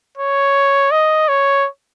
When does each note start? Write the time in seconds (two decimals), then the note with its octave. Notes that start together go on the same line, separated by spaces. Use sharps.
0.18 C#5
0.91 D#5
1.29 C#5